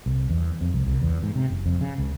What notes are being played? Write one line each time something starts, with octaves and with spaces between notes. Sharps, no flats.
C2
E2
F2
C2
C2
E2
G#2
C3
F#1
F2
C#3
C#2